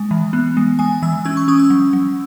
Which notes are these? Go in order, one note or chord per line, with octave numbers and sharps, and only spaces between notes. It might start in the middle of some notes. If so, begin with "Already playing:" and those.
Already playing: G#3
E3
B3
G#3
G#3 G#5
E3 E6
C#4 E6
C#6
C#4 D#6
E6
F#3
F#3